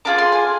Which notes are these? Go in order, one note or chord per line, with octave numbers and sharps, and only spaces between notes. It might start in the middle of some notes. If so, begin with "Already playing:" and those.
D4 F4 G#4 D6
C6
G#5